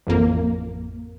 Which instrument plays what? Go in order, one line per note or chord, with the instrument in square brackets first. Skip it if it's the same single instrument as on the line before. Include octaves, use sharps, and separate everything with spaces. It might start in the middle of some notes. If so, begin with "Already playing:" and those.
[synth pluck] A1 F2 A#3